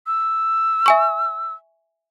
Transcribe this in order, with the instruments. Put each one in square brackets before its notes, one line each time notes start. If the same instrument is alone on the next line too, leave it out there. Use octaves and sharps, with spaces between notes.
[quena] E6
[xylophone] E5 G#5 C#6